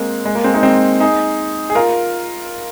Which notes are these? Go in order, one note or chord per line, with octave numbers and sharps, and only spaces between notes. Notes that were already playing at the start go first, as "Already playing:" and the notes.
Already playing: G#3 A#3 C4
G#3
A#3
G#3 C4
A#3 D#4
G#3 C4
D#4 G#4
G#4
F4 A#4